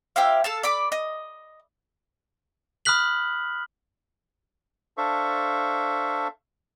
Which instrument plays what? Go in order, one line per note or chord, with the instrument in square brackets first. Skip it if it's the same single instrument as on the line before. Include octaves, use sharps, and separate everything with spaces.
[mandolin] E4 G4 C5 F5
A4 F5 A5
D5 B5 D6
D#5
[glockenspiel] B5 D#6 F6 F#6 B6 F#7
[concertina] D4 A4 C5 E5 F5 C#6